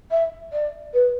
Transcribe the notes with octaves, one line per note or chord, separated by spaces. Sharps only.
E5
D5
B4